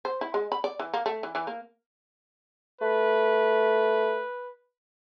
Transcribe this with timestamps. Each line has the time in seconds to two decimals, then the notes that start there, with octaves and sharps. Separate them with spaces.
0.05 C5
0.21 E4
0.34 G#3
0.52 B5
0.64 D5
0.80 E3
0.94 A#3
1.06 A3
1.23 E3
1.35 E3
1.47 A#3
2.81 A3 B4